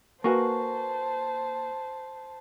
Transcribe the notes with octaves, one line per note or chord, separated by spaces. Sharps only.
A#3 F#4 B4 C5 G#5 A5 C#6